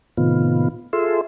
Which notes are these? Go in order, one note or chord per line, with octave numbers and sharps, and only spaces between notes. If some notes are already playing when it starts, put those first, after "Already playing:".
A2 C3 D#3 B3 F4
F4 G#4 A4 E5 C6